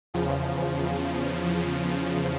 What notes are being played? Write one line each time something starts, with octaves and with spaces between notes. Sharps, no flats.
E2 C#3 F3